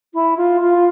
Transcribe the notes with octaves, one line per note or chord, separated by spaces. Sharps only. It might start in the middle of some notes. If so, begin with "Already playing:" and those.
E4
F4
F4